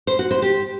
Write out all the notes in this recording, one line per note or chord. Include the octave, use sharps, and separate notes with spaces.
C5
F#4
C5
G4